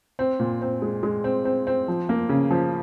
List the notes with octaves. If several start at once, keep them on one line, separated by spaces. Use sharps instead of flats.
C4
A#2
C4
G#3
G#3
C4
C4
C4
F3
A#3
C#3
F3